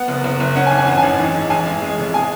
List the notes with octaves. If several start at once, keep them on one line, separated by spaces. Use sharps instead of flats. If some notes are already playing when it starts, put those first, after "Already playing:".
Already playing: B3 F#5
F#1
F#1
F#1
C#4 F#5
G#5
G#1
G#5
A1 F#5
G#5
A1
G#2
G#2
A1 G#5
A1
G#3
F1
G#3 G#5